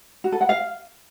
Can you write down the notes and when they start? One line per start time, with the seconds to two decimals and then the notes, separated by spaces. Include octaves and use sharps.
0.24 F#4
0.32 A4
0.41 F#5
0.49 F5